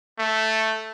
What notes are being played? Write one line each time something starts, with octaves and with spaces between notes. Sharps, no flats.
A3